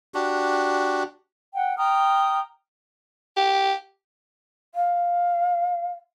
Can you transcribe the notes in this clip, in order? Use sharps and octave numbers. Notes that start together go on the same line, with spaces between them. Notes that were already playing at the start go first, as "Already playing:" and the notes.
D4 F#4 G4
F#5 G5
G5 A#5 D#6 F6
G4
F5